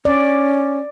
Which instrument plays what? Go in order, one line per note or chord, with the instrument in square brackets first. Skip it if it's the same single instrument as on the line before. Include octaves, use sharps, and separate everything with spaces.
[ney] C#4 [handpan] D5